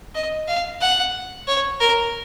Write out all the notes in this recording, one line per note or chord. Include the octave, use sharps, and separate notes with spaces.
D#5
F5
F#5
C#5
A#4